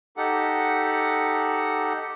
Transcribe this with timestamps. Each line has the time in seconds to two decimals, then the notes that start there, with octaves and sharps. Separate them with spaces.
0.17 D#4 G4 A4 F#5